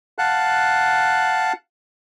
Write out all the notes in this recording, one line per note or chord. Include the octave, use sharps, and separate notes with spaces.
F5 F#5 A5 F#6